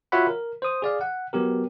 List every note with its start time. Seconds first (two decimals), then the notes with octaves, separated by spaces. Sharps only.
0.12 F4 F#4 C#5 E5 F#5 B5
0.27 A#4
0.62 C5 D#6
0.82 G#4 D5 F5
1.01 F#5
1.33 F#3 B3 G4 A#4